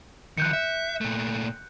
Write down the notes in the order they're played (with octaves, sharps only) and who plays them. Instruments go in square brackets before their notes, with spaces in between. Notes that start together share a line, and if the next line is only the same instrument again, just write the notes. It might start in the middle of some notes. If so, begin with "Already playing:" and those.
[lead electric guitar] D#3 F3 [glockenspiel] F#6 G6 C#7
[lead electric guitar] E5
A#2 A3